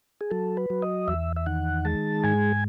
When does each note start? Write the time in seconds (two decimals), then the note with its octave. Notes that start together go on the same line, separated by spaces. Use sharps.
0.21 G#4
0.31 F#3 A4
0.57 B4
0.70 F#3
0.82 D#5
1.08 E2 E5
1.36 E5
1.46 D#3 F#5
1.85 G#3 A5
2.24 G#2 G#5